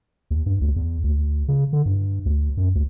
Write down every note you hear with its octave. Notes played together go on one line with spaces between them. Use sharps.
D#2
G2
D2
E2
D2
C#3
D3
G2
D2
F#2
D2